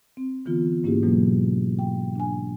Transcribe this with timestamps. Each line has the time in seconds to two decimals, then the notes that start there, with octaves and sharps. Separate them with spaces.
0.17 C4
0.46 D3 E3 B3 F4
0.83 G#2 A#3 C#4 E4 G4 G#4
1.03 B2 E3 F#3 G#3 A#3
1.79 G5
2.15 D4 G#5